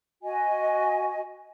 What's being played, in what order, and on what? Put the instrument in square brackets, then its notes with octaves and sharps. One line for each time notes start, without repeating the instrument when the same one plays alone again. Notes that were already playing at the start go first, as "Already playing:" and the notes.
[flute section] F#4 D#5 G#5